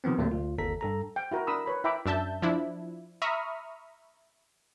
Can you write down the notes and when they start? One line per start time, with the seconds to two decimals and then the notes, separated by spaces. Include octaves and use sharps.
0.04 C3 D#3 F3 B3 C4
0.18 D2 A2 C3 F#3 A3 A#3
0.31 D2 F4
0.58 G1 D#2 A4 A#5 B6
0.81 G2 A4 A#5
1.16 G5
1.31 E4 F#4 A#4
1.47 D4 A#4 B5 D#6 E6
1.66 B4 C#5 B5
1.84 E4 E5 G5 A#5 B5 D6
2.06 F#2 D4 E5 A5 G6
2.42 F3 D4 E4
3.22 E5 A#5 B5 C#6 D#6 F6